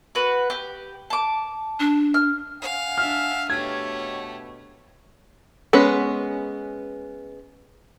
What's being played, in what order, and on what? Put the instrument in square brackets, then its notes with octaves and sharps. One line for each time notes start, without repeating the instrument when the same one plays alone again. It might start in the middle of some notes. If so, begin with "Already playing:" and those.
[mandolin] F#4 B4
G4
A5 D6
[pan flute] D4
[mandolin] F6
[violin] F5 [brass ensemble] F#5 G#5
[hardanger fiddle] D4 E5 [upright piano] F6
[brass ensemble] B2 [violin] A3 [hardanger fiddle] G4 C#5 [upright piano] G#6
[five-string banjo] G#3 B3 C#4 B4